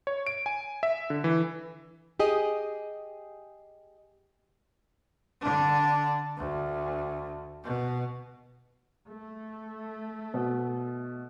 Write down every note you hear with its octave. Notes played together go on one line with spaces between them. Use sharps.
C#5
D7
G#5
E5
D3
E3
G4 G#4 D#5
D3 D4
D2
B2
A3
B2